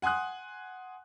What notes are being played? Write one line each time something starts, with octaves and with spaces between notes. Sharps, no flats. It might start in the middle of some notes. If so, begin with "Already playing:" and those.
F#5 G#5 C6 D#6 F#6